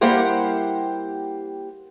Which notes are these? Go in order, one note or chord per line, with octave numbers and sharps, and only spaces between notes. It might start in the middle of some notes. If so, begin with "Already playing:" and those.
G3 A#3 E4 G4 C5 F#5